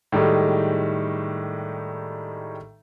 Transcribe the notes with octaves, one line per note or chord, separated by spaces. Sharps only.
A2 D#3 G3 G#3 D#4